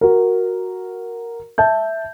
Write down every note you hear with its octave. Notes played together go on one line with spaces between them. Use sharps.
F#4 A#4
E5 A5 G6